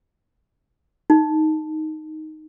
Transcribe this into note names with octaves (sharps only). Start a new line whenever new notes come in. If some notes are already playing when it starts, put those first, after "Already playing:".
D#4